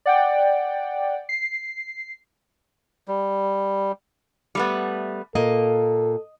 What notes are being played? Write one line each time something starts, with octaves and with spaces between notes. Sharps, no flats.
D5 F#5 G5
C7
G3
G3 A3 B3
A#2 A#3 A4 D#5